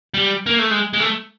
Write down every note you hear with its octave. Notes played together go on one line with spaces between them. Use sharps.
G3
A#3
A3
G#3
G#3
A3